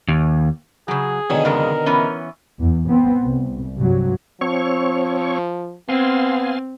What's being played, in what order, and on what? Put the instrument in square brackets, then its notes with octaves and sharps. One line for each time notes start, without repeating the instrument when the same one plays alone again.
[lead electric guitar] D#2
[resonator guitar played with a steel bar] C#3 F#3 [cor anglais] G#4
[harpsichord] B2 D3 D#3 [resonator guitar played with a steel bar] C#5
[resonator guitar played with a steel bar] F2 C#3 G#3 [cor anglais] A#4
[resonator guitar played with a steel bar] E3 B3 C#4
[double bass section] E2
B3 C4
C2
G2 C3 F#3
[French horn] F3 [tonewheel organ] C4 C#5 C#6
[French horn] B3 [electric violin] C4 [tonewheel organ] F5 G#5 C6